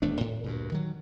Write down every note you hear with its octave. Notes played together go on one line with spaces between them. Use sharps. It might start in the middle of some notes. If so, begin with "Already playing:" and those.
D#1 E2 A3 D4
A2
D2 G2 A#2
D#3 F#3